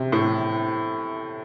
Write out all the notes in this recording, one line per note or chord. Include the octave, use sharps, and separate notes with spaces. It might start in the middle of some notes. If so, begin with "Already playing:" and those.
Already playing: C3
A2